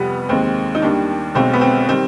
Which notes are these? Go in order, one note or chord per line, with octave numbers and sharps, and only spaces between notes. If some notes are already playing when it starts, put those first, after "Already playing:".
Already playing: F2 C3 G3 B3
D#2 D#3 G#3 C4
D#4
D#2 D#3 G3 D4
B1 B2 G#3 C4
B3
C4
D#3 G3 C4